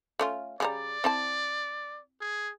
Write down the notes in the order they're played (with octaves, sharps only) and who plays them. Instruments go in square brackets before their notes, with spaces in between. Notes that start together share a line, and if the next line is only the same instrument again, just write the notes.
[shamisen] A3 C#4 F4
[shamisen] C#3 G3 A#5 [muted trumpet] D5
[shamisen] C4 E4 A5
[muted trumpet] G#4